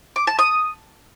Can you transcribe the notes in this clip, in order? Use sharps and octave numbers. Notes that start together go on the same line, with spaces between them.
D6
A5
D#6